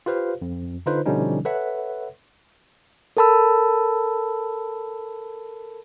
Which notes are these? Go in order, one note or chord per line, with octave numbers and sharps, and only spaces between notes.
F4 G4 B4 C5 F5
F2
D3 D#4 F4 B4 C5
B2 D3 F3 G3 C#4 D#4
A4 B4 C#5 E5 F#5
A4 A#4 A5 B5 E6